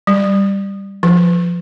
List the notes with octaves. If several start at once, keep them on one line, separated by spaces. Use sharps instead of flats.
G3
F3